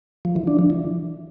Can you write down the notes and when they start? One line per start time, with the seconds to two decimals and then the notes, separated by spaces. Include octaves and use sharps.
0.25 F3
0.36 E3
0.47 D4
0.59 F3
0.70 E3